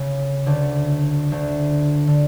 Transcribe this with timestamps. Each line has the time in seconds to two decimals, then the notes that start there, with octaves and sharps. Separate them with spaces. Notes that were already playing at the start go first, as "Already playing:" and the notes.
Already playing: C#3
0.46 D2 D3
1.32 D2 D3
2.07 D3